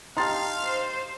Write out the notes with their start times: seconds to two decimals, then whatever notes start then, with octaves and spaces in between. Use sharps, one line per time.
0.17 D#4 G4 F5 A5 A#5 C6 A6
0.64 C5